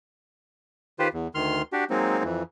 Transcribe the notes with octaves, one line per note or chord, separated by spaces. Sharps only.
D#3 F4 G4 B4 C5
E2
D2 D#3 C6 F6
D4 F#4 G4
F#3 G#3 A#3 C4 D#4
F2 E3